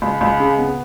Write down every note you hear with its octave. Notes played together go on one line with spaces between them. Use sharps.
C#2
C#2
C#3
B3